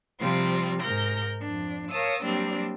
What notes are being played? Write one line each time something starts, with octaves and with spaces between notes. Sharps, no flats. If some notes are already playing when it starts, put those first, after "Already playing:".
C3 F3 G3 C4 F4
G#2 A#4 F6 G6 A#6
F2 D4
A#4 C#5 F5 A5 D#6 E6
F#3 G3 A#3 C4 D4